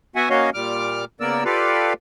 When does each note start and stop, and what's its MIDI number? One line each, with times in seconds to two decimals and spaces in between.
0.16 0.29 59
0.16 0.29 66
0.16 0.29 76
0.16 0.29 78
0.16 0.29 80
0.30 0.50 58
0.30 0.50 61
0.30 0.50 66
0.30 0.50 73
0.30 0.50 75
0.30 0.50 77
0.54 1.05 46
0.54 1.05 55
0.54 1.05 86
0.54 1.05 89
1.20 1.44 49
1.20 1.44 58
1.20 1.44 59
1.20 1.44 70
1.20 1.44 74
1.20 1.44 88
1.45 1.93 65
1.45 1.93 67
1.45 1.93 69
1.45 1.93 71
1.45 1.93 74
1.45 1.93 77